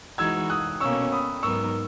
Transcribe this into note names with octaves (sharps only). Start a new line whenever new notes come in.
E3 G#3 D#4 F#4 E6 G#6
D#6 F#6
B2 A#3 C#4 C#6 E6
B5 D#6
G#2 F#3 B3 D#4 A#4 C#6 E6